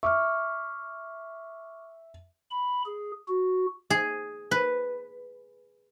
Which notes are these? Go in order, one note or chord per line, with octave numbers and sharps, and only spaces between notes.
E5 C#6 D6 F6
B5
G#4
F#4
G#4
B4